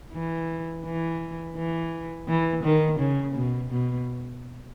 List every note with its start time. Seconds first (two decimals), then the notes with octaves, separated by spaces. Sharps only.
0.12 E3
0.84 E3
1.56 E3
2.28 E3
2.63 D#3
2.99 C#3
3.35 B2
3.71 B2